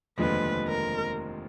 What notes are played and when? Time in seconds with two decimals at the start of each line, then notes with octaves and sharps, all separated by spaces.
0.18 F1 D#2 D3 F3 G#3 B4
0.68 A#4